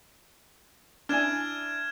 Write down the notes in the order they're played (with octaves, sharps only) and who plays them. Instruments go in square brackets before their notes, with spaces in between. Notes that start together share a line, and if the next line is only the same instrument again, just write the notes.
[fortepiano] D4 E4 G#5 [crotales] F6 G#6 E7